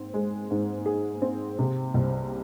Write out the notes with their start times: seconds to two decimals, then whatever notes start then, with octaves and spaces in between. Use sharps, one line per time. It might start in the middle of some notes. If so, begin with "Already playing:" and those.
Already playing: G#2 C4
0.14 G#3
0.51 G#2
0.86 G#4
1.22 C4
1.59 C3
1.94 C2